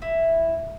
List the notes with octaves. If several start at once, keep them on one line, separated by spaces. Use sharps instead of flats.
E4